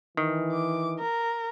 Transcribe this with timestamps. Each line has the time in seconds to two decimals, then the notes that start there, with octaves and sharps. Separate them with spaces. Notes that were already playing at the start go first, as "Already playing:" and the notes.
0.17 D#3 E3
0.52 D6
0.99 A#4